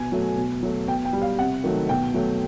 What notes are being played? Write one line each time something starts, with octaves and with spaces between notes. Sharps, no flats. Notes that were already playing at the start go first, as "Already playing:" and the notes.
Already playing: B2 G#5
F#3 A3
B2
F#3 A3
B2 G5
G5
G3
F5
C3 F#5
D#3 F#3 A3
B2 G5
F#3 A3